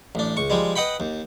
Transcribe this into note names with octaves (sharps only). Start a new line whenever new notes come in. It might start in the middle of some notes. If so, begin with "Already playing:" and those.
A1 D4
C#2 C#6
F3 G3 G#3
B4 D#5 F#5 G5 B5
D#2